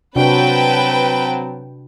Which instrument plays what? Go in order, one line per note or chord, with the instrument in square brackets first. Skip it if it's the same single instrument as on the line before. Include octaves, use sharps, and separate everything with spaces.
[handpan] C3 D4 F#4 [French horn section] F#3 C4 [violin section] B4 G5 A5